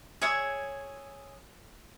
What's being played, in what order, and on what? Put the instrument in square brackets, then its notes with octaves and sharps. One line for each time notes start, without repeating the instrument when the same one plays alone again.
[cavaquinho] G#4 C#5 E5 D#6